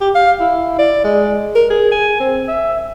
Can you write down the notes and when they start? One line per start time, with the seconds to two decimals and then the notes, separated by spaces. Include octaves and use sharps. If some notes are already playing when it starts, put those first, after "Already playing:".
0.01 G4
0.15 F5
0.40 E4
0.79 D5
1.04 G#3
1.55 A#4
1.70 G#4
1.91 G#5
2.20 C4
2.48 E5